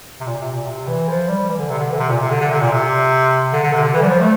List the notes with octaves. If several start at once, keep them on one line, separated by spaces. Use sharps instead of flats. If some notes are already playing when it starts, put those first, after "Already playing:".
C3
A#2
C3
A#2
C3
E3
F3
G3
E3
D3
C3
D3
E3
D3
C3
A#2
C3
D3
D3
C3
A#2
C3
D3
D3
C3
D3
E3
G3
F3
A3